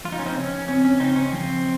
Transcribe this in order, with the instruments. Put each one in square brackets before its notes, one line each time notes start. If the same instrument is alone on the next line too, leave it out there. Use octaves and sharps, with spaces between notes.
[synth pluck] F3 [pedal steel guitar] F4
[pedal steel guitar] D#4
C#4
C4 D#4
[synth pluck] C#3 [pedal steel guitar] C#4
[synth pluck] C4 [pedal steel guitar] C#4
[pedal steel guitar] C#4
[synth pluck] C#3 [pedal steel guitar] C4 D#4
[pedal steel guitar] C#4
[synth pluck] F3 [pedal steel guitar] C4